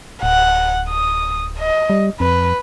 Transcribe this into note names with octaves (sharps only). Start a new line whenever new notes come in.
D1 F#5
D#6
D#5
G3
F2 B4